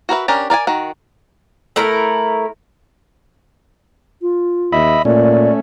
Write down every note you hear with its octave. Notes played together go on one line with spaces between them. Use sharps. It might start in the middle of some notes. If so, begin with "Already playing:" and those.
F#4 A#4 B4 E5
C#4 D4 G4 A#4 D5
A#4 D5 F5 G#5
D#3 F#4
A3 E4 A#4
F4
D#2 D#5 E5 B5
A#2 A3 C#4 D5